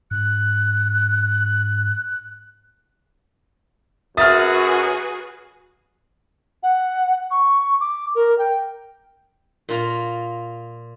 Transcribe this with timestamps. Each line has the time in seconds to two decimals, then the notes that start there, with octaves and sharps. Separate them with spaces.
0.11 G#2 F#6
4.17 F#2 F#4 G#4 B4 E5 D#6 F6 A6
6.63 F#5
7.31 C#6
7.81 D6
8.15 A#4
8.39 G5
9.69 A#2 F4 A#5